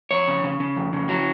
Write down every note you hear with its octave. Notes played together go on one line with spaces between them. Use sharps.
F2 C#5
C#3
C#3
C#3
F2
C#3
F#3